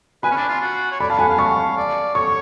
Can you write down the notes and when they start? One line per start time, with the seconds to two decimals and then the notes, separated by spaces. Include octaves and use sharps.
0.23 B4 G#5 B5
0.31 C#4
0.36 D4
0.49 F4
0.61 F#4
0.91 C#5
1.00 D5 B5
1.10 F5 A5
1.19 F#5 G#5 B5
1.29 F5
1.38 A5 C#6
1.77 D5
2.15 C#5 C#6